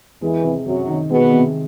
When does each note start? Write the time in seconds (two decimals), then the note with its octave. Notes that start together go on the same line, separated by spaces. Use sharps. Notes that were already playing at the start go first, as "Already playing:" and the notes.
0.21 E2 E3 G#3
0.43 C3
0.65 F#2 C3 F#3
0.87 D#3
1.10 B2 G#3 B3
1.32 C3